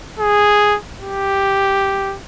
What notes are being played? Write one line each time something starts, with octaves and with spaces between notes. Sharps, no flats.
G#4
G4